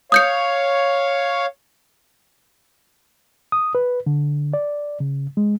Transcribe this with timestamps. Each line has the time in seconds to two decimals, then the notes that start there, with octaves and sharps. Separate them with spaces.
0.12 C#5 F5 D#6 G6 C#7
3.52 D#6
3.75 B4
4.06 D3
4.54 D5
5.00 C#3
5.37 G#3